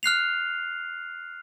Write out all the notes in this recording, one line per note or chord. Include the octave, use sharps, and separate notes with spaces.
F6 F#6 C7 F7